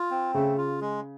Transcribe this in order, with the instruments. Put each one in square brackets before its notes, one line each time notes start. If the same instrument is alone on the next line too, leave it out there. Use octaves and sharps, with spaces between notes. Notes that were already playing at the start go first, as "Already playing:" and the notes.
Already playing: [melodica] F4
C4
[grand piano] C#3 [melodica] A3
[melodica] F4
G#3